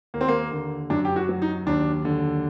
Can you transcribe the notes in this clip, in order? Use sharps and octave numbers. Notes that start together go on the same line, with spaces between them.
D#2 A#3
C4
A#3
D3
F#2 D4
G4
F#4
F#3
D#4
D#2 D4
D3